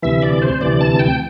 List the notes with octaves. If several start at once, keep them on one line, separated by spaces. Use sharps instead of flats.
D2 C3 E3 E5
D5
C5
D2 C3 E3 D5
A5
G5